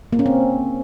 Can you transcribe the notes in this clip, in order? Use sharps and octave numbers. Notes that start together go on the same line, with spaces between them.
A#3
C#4
C4